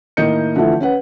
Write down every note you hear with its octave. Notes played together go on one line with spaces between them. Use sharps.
A2 D#3 A#3 D#5 G6 C#7
D3 E3 F3 A3
C#4 B4 F#5